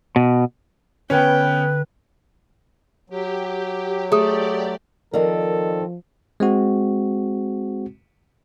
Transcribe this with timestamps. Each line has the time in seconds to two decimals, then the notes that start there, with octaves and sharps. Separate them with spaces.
0.16 B2
1.10 D3 B3 C#4 B4 G5
3.10 F#3 G4
4.12 A3 G4 G#4 D5 D#6
5.14 D#3 F3 C4 A4 A#4 D5 D#5
6.40 G#3 C4 F#4